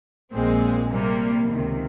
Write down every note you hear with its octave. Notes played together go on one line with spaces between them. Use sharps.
A#1 A#2 G#3 C4
C3 G3 A#3
C#2 C3 D#3